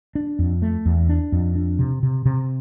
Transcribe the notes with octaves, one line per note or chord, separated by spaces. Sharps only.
D4
F2
A3
E2
D4
F2
D4
C3
C3
C3